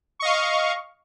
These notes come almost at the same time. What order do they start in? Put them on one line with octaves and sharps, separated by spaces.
C#6 D#5 F5